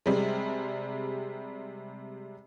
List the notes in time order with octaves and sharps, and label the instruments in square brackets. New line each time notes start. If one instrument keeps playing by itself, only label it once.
[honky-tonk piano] C3 G3 G#3